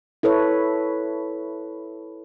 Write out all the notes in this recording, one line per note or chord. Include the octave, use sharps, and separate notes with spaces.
E4 A4 B4 C#5